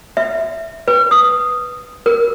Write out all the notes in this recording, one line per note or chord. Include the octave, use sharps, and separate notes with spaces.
E5
B4
D#6
A#4